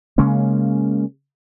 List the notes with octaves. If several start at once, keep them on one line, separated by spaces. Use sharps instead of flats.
C#3 G#3 A#3 C#4